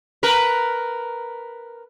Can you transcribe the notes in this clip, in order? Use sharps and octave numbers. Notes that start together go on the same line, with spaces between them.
A#4 B4